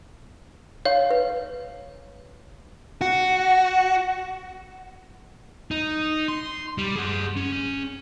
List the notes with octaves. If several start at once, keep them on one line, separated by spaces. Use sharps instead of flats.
C#5 F5
B4
F#4
D#4
C6
G3
G#4 F#5
C#4